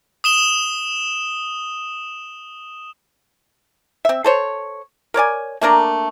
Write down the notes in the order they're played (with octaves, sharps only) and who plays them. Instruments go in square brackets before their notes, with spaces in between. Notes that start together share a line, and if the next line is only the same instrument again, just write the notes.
[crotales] D#6 E7 G7
[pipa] C4 E5
A4 C5 C#5
A#4 C#5 D5 G#5
A3 A#3 D4 A#4